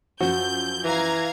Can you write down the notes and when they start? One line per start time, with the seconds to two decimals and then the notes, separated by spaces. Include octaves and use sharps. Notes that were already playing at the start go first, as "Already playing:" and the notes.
0.21 F#2 F3 F#4 G6
0.84 E3 F5 A#5 G#6